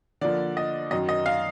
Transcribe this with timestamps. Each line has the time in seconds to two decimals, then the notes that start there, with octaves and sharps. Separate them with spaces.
0.21 D3 F3 A#3 D5
0.57 D#5
0.91 F#2 D#3 F#3 D#5
1.09 D#5
1.26 F5